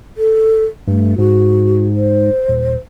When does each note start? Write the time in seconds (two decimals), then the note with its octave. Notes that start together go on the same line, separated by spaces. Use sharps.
0.17 A4
0.87 G2 A3
1.18 G#2 F#4
1.95 C5
2.48 D#1